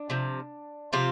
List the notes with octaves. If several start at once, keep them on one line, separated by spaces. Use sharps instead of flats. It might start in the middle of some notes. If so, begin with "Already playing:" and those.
Already playing: D4
C3 F3
C3 F3 C4 F4